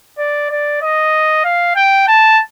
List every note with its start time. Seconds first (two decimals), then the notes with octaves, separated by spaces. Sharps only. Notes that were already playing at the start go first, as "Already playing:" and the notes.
0.18 D5
0.50 D5
0.82 D#5
1.44 F5
1.76 G5
2.08 A5